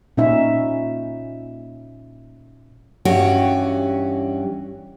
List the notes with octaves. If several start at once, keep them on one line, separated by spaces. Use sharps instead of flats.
A#2 C#4 D#4 E5
G2 E3 C#4 F#4 G4